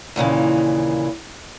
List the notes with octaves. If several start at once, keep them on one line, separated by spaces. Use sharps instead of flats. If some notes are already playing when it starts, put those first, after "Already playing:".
D#2 A#2 C#3 E3